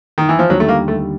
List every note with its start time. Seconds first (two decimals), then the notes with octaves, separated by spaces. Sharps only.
0.18 D#3
0.29 E3
0.39 F3
0.49 D#2 D3 F#3 G3
0.60 A3
0.69 A#3
0.88 A3